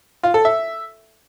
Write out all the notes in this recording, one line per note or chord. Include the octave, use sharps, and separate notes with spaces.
F4
A4
E5